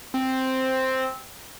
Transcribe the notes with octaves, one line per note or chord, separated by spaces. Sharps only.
C4